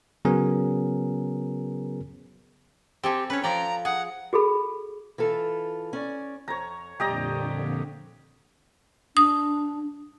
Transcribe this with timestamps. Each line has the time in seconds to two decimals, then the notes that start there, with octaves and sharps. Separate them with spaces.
0.25 C#3 F#3 B3 C#4 G#4 A#4
3.04 C4 G4 A4 G#5
3.30 C#4 B4 C#5
3.43 F3 D5 G5 A#5
3.85 G#4 F#5
4.33 F#4 G#4 A4 B5
5.18 E3 F4 A4
5.93 C#4 D5
6.48 F2 C#5 A#5
7.00 F2 A#2 D3 G3 G4 D#5 A#5
9.17 D4 D#6